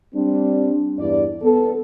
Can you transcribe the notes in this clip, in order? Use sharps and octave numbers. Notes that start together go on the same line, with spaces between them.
G3 C4 D4
E2 G2 E4 D5
B3 A4